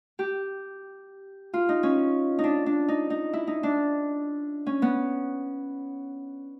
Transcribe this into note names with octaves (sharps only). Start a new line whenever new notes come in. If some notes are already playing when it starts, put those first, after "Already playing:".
G4
F4
D#4
C#4
D#4
D4
D4
D#4
D#4
E4
D#4
D4
C#4
B3